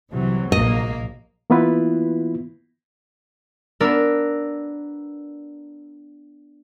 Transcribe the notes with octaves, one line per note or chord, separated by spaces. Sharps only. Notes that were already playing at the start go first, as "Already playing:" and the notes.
C2 C3 E3 F#3
A#1 A#3 D#5
E3 A#3 B3 E4 F4 B4
B3 D4 A#4 D5 E6